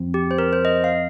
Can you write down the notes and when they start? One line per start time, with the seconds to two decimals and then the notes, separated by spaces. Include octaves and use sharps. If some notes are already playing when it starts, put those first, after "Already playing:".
Already playing: F2 F3 C4
0.14 G4
0.31 C5
0.38 A#4
0.53 C5
0.65 D#5
0.84 F5